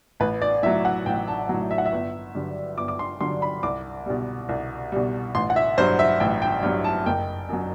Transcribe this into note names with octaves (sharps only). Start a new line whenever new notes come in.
A1 B4
D5
A2 F#3 E5
F#5
A1 G5
A5
A2 F#3
E5
F#5
E5
G1
G2 D3 F#3
G1 D6
D6
C6
G2 D3 F#3 C6
B5
C2 D6
B2 G3
C2
B2 G3
A1 C6
F#5
E5
G2 F#3 C5
E5
A1 G5
G5
G2 F#3
A5
F#1 G5
F#2 F#3